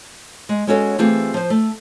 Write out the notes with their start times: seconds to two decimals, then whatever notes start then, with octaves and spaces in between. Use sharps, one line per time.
0.49 G#3
0.67 G#3 B3 C#4 F#4 A4 C#5
0.98 E3 A3 C4 F4 G4 G#4
1.34 F3 C5
1.50 A3